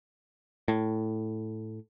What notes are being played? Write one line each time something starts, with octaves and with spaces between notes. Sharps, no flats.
A2